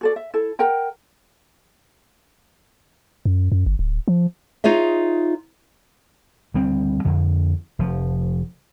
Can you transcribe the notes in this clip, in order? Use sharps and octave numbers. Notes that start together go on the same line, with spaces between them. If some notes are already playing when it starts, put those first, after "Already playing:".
F#4 A4 D5
E5
E4 A4
A#4 F#5 G5 A#5
F#2
F#2
G1
D1
F3
D#4 F4 G#4 C#5 E5
D2 G3 C4
F2 D3
F1 F3